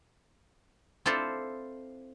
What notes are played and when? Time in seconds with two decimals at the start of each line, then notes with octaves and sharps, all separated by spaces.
1.06 C4 E4 F4 A4 C5 D5